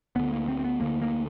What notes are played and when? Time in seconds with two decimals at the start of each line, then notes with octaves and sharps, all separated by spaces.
0.16 D2 D3 B3
0.32 A#3
0.48 C4
0.59 C4
0.64 B3
0.80 D2 D3 A#3
1.02 A#3